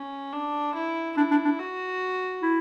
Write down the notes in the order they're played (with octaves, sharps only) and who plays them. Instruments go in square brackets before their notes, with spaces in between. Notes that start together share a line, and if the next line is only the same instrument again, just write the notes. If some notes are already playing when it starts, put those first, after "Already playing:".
Already playing: [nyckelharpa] C#4
D4
E4
[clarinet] D4 [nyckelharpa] E4
[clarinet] D4
D4
[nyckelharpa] F#4
[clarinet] E4